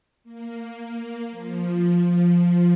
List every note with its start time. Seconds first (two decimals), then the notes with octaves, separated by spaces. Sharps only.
0.24 A#3
1.31 F3